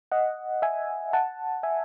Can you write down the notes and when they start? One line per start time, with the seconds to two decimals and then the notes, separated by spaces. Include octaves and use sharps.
0.12 D#5 F#5
0.62 E5 G#5
1.13 F#5 A5
1.63 E5 G#5